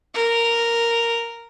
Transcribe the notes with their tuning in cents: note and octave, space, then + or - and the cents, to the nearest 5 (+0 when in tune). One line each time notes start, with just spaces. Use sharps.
A#4 -5